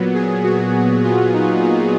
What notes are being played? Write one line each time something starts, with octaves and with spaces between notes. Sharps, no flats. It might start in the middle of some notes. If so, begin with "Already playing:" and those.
Already playing: A#2 F#3 B3
G#4
F#4
F4
D#4
D#4